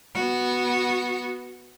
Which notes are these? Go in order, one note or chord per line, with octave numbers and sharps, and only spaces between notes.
B3 F#4